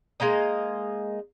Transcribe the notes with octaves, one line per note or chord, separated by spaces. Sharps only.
G#3 A#3 D#4 D#5